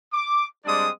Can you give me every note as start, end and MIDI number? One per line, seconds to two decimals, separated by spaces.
0.13 0.45 86
0.65 0.88 55
0.65 0.88 56
0.65 0.88 60
0.65 0.88 62
0.65 0.88 74
0.65 0.88 87